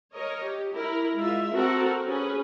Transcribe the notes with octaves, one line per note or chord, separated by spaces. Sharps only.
A#4 C#5 D#5
G4
E4 A#4
G#3 F4 E5
C4 F#4 A4 A#4
C#4 G#4 B4